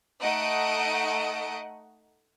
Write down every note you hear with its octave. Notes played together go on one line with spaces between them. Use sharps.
A3 D#4 D#5 F#5 D#6 D7